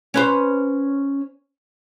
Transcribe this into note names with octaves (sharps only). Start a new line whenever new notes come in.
C#4 B4 C5